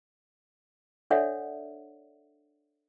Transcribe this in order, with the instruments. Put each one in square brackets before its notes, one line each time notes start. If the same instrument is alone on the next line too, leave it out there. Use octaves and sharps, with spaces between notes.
[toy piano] D4 A4 C#5 D5 E5 F#5